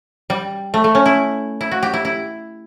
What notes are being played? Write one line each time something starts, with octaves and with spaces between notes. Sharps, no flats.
G3
A3
A3
C#4
E4
E4
F#4
G4
E4
E4